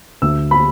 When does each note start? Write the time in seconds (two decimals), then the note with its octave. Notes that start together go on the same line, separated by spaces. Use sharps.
0.22 D2 E6
0.51 B5